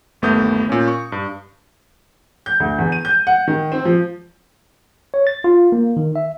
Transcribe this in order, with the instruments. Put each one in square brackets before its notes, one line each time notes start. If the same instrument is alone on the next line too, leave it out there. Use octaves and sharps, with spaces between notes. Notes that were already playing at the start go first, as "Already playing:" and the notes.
[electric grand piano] G1 D#2 A3 B3 D#6 G6
A#2 C#4
C#6
G2
[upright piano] G6
D2
E2
D#7
G6
F#5
D#3
C4
F3
[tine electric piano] C#5
A6
F4
A#3
D#3
E5